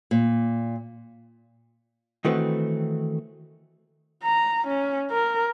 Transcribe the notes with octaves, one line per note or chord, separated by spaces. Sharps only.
A#2
D#3 E3 A3 C4 F#4 B4
A#5
C#4
A#4